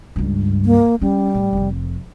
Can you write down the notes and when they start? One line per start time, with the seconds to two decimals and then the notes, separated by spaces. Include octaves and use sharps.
0.16 C#2 G2
0.65 A#3
1.01 G3 C#4
1.34 A2
1.53 F1 F2